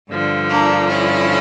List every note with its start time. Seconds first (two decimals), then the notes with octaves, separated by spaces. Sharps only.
0.10 G2 D3 F3
0.49 A#3 D4
0.88 C#4 E4